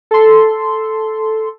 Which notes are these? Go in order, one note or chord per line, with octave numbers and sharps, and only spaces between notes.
A4 C6